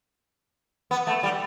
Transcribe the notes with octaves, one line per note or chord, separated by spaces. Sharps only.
B3
A3
G3